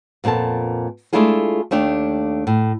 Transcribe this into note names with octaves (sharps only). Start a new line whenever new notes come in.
F2 A#2 B3 A4 A5
G#3 A3 D4 E4 F4 G#4
D#2 A3 D4 F5 G5
A2